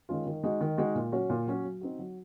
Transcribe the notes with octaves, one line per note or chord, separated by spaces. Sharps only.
D#3 G#3 C#4 F4
D#3
G#3 D#4 F#4
D#3
G#3 D#4 F#4
A#2
F#3 C#4 F#4 C#5
A#2
F#3 C#4 F#4 C#5
F#3
C4 D#4 F#4
F#3